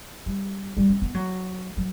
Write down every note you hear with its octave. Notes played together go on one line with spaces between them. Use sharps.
G3
G3
C#4
B3
F#3
F#3